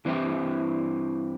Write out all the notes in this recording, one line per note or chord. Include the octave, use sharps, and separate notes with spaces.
G2 E3 C4 E4 G4